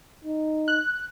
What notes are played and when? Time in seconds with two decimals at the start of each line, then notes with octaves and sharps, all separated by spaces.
0.25 D#4
0.68 F#6